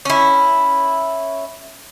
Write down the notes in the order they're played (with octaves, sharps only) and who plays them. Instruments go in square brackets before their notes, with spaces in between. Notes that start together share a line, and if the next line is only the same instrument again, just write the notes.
[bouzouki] C#4 E4